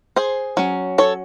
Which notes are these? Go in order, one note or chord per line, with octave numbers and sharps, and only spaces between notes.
G#4 C5
F#3 C#4
A4 C#5